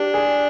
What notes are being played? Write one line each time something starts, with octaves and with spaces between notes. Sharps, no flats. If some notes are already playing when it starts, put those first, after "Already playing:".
Already playing: D4 G4
G#4